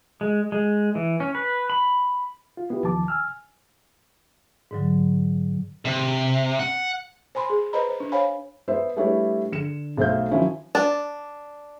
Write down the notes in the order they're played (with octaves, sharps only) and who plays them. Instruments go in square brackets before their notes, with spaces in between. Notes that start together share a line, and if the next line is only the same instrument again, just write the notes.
[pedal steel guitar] G#3
G#3
E3
C#4
B4
B5
[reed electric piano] F4
B3 E4 F4 G4 B4
D#2 D#3 F3 A5 D6
G#5 E6 F6
[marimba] G#2 D3 F#3
[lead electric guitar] C3
F#5
[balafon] C5 G#5 B5 C6
G#4
B4 C5 D#5 A#5 B5
C5
D4
C5 C#5 F5 G#5 B5
[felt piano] B3 C5 E5
G3 A3 D4 E4 B4 C#5
D3 C#7 E7
B1 A3 C5 E5 F5 G6
D#3 F3 F#3 C#4 E4 C5
[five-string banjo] D4